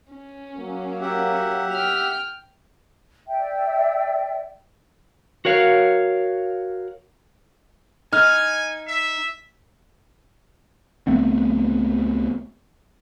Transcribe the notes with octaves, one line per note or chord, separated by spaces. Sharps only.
C#4
F#3 A#3
G4 E5 F#5
G5 F6
D5 E5 G5
F#4 A#4 C#5 F5
D#4 G#5 F6
E5
C#2 A3 B3 C4